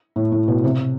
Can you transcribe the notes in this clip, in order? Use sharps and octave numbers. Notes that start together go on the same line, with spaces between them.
A2
A2
B2
C3